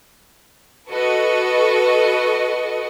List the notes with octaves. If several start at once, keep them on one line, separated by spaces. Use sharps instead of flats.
F#4 A4 B4 D#5 C#6